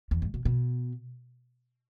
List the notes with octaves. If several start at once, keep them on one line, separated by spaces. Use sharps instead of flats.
E2
G#2
B2
B2